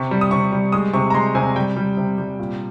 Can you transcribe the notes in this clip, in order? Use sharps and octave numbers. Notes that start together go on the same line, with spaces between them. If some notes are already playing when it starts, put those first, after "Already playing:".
Already playing: C3 C#6
G3
D#6
C3 C#6
G3
G#3 D#6
C3 C#6
A#5
G#3 C6
C3 G#5
G3 G5
G3
C3
G3
A#2